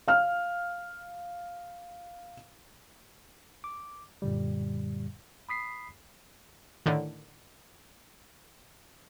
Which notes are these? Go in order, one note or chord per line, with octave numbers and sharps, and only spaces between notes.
F5 F6
D6
F#2 A#2 D3 G3
B5 D#6 B6 C7
A2 D3 D#3